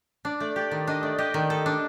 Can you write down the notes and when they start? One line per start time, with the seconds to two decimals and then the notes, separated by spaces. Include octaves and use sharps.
0.25 D4 D5
0.40 A3 D5
0.56 G4 D5
0.71 D#3
0.87 D4 D#5
1.03 A3 D5
1.18 G4 D#5
1.34 D#3
1.50 A4
1.66 D4